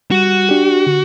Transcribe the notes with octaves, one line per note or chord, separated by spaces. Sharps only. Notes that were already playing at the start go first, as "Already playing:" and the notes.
G3 F#4
D4 G4
D3